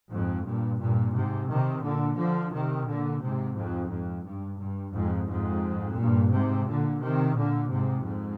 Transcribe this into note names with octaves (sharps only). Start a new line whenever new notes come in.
F2 G#2
G2 A#2
G2 A#2
G#2 C3
C3 D#3
A#2 D3
D3 F3
C3 D#3
A#2 D3
G#2 C3
F2 G#2
F2
G2
G2
F2 G#2
F2 G#2
G2 A#2
G#2 C3
A#2 D3
C3 D#3
A#2 D3
G#2 C3
F2 G#2